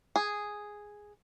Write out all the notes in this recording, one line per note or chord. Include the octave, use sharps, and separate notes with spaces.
G#4